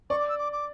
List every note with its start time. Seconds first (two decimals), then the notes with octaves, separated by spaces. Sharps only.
0.10 D5 C#6
0.19 D6
0.29 E6
0.38 D6
0.52 D6